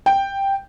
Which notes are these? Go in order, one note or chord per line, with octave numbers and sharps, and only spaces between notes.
G5